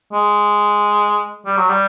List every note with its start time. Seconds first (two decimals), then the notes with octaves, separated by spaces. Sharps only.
0.13 G#3
1.46 G3
1.57 F#3
1.69 G3